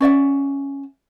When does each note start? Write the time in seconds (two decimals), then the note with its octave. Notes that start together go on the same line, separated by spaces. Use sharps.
0.01 C#4 D5 E5 F#5